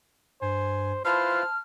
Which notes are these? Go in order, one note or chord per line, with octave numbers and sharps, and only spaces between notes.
G2 C5 G#5
E4 F4 B4 C5 A5 F6